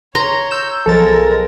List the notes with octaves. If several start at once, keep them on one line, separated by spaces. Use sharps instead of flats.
C#5 A#5 C6
E6 G6 E7
B1 F3 G#3 A4 A#4 A6